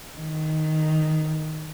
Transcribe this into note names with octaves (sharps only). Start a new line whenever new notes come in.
D#3